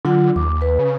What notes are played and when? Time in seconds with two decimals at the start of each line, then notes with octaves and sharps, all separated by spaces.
0.05 D3 F#3 F4 F#5
0.36 D#2 D6
0.62 B4
0.79 C#3